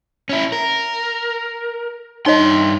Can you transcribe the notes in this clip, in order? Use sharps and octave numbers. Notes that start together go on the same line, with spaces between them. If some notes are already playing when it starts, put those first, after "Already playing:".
C#4 E4
A#4
G2 D#4 C#5 D#5 C6